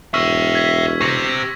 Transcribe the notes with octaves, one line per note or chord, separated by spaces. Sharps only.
E1 C#5 E5 C#6 E6 F6
G#6 B6
G4 C5 C#6 A#6